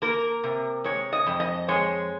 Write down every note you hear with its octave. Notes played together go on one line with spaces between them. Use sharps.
A#3 A#4
C3
G#3 C#5
D#5
F2
D#5
G#3 C#5